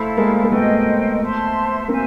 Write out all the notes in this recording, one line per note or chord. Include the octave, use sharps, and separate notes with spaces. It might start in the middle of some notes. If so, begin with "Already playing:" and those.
Already playing: A3 E4 A4 C5 F5
G#3 A#3
A#3
A3 B3 C5 D#5 G5
C5 E5 A5 C6
A#3 C4 C5 E5 G#5